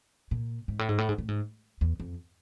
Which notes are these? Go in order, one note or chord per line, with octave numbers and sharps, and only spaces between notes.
A#2
G#2
A2
G#2
A2
G#2
A2
G#2
E2
F2